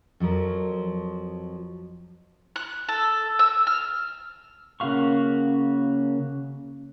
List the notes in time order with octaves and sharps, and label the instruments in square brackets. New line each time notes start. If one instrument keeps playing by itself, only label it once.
[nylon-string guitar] F2 F3 F#3 A#4
[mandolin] F#6
A4
E6
F6
[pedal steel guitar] C#3 A#3 F#4 F5 C#6